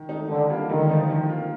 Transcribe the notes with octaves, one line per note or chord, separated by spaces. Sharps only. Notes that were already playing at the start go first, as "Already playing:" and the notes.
Already playing: D#3
A3 D#4
D3 D#3
G3 A#3 F4
D3 D#3
F3 A3 D#4
D#3
A#3 F4